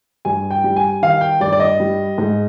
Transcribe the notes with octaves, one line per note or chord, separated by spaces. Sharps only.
G2 G#5
G5
G3
G#5
D#3 F5
G5
G2 D5
D5
D#5
G3
G#2